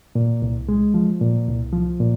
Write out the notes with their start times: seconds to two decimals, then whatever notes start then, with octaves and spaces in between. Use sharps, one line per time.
0.15 A#2
0.42 C2
0.69 G#3
0.94 F3
1.21 A#2
1.47 C2
1.73 F3
2.00 A#2